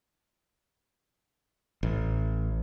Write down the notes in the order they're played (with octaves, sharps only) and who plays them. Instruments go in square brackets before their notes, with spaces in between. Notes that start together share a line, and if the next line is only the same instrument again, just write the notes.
[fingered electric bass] A1